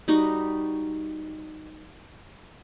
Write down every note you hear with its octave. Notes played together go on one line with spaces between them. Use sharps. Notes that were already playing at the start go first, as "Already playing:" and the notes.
G3 D#4 F#4